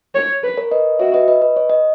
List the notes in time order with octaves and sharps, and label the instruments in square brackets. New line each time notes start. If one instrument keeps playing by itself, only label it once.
[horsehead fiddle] C#5
B4
[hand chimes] A#4 C#5
B4 D#5
[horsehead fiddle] F#4 [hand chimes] C#5 E5
[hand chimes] B4 D#5
B4 D#5
B4 D#5
C#5
D#5